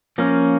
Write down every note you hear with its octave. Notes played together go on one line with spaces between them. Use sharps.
F3 A#3 C#4